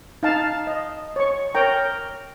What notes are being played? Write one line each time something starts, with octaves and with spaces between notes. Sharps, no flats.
D#4 F5 A5
D#5
C#5 C#6
A#4 C#5 G5 A#5